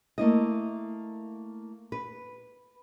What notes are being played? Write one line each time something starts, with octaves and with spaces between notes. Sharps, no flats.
A3 A#3 E4 D#5
B4